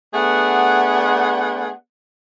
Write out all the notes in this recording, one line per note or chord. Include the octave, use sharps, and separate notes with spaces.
A3 B3 D4 G#4 F#5